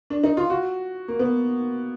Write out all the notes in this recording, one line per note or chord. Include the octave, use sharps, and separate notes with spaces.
D4
D#4
F4
F#4
A#3
B3